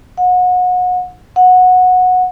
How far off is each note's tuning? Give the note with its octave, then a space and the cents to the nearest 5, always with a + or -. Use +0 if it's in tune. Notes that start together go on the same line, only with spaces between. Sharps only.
F#5 -30
F#5 -15